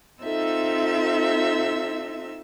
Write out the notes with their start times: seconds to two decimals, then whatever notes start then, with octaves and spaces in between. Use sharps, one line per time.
0.22 C4 D#4 F4 A4 E5 E6